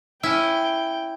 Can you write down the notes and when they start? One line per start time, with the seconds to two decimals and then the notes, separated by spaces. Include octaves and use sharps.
0.23 C#4 E4 G5